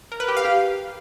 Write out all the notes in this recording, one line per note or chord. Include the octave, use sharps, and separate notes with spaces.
A#4
B4
G4
F5
G4